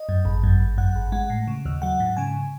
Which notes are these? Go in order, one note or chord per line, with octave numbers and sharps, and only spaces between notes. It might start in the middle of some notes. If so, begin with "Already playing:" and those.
Already playing: D#5
F#2
G#1
F#2
G#1
F#2 F#5
G#1
G#3 F#5
A2
C#3
D#2
F#3 F#5
G#2
C#3 G#5